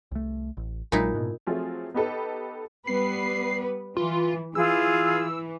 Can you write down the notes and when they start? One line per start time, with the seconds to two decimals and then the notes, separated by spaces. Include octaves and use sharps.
0.11 C2 A3
0.57 A1
0.92 A#1 A#2 F#3 G#3 D#4 E4
1.14 G#2 B2
1.47 F3 F#3 A3 C4 F4 G#4
1.94 B3 D#4 G4 A4 B4
2.87 G3 B3 B4 C7
3.97 E3 F4
4.55 E3 F4 G#4 E6